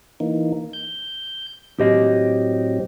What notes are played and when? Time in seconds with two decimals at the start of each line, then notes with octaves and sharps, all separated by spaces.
0.20 E3 A#3 D#4
0.73 G6
1.80 A2 F#3 C4 G4 D#5